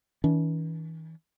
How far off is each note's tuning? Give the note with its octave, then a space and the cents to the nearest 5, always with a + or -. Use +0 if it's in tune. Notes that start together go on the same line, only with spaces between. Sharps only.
E3 -45 C#4 +45